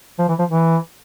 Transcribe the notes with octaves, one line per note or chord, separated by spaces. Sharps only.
F3
E3
F3
E3